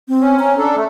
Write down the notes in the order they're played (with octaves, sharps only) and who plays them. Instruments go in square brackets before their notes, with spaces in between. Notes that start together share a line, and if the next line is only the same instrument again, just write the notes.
[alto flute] C4
[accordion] C#4
[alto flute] A#5
[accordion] D4 A4
A3